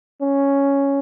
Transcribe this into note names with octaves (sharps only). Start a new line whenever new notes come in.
C#4